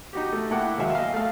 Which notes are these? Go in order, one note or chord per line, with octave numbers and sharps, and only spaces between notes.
D#4 F#4 G4
A3
A2 A#3 E4 F#5 G5 D6
D#2 F#3 G#3 E5 F5
D#5 F5
A3 F5